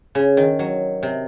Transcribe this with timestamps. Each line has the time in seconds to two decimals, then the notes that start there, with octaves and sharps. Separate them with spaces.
0.15 C#3
0.37 D#3
0.59 F#3
1.03 C3